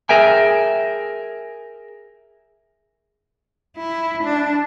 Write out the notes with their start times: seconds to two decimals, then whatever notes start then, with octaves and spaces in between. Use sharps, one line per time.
0.09 G#4 A#4 E5 G5 G#5
3.77 E4
4.23 D4